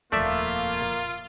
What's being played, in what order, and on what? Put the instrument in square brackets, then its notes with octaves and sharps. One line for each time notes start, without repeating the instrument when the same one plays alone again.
[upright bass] D#1 F2 [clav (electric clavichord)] A3 D5 E5 [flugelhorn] A#3 [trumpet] F4